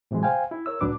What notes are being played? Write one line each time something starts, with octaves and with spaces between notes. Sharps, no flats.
A2 C3 E3 F#3 G#3
C5 F5 G5 G#5
E4
A#4 C#5 E6
C#2 A2 F#3 D4 B4 D6